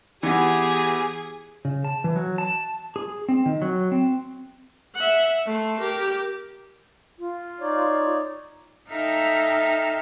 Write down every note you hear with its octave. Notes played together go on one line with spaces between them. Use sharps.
E3 B3 G4 G#4 G#5
C#3
A5
E3
F#3
A5
G#4
C4
D#3
F#3
C4
E5 F#5
A3 C6
G4 A#4
F4
D#4 C#5 D5
D#4 A4 E5 F5 G5 A#5